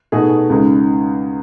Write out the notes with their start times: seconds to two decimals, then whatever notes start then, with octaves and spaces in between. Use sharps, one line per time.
0.12 B2 A3 D#4 G#4
0.50 C#2 C#3 G#3 D#4 G#4